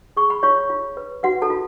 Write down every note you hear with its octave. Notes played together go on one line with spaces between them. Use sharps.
G#4 C#6
B5
F4 C#5 C#6
F4
B4
F#4 B4 F#5
A4 A5
F4